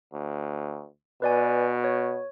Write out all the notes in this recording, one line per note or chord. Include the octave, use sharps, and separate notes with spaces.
D2
B2 B4 D5 G#5
C#5